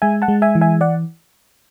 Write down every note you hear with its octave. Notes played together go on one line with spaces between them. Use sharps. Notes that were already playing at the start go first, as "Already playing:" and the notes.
G#3 E5 G#5
F#5 A5
G#3
E5 G#5
E3
E5 G#5
D5 F#5